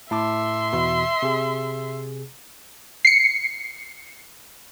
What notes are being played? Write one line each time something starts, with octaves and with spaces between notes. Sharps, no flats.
A2 E5 A5 C6 D6
E2 B2 E3
C3 G#4
C7 C#7